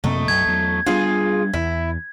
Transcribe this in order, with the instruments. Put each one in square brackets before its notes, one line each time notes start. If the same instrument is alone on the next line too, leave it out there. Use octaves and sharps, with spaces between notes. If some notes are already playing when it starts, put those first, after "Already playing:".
[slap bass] F#2 C3 A#3 [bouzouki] A3 D#4
[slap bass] B1 F#2 [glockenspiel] G#6
[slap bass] E2 F#3
[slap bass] G3 B3 D4 [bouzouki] F4 G#4
[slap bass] E2 [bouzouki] E4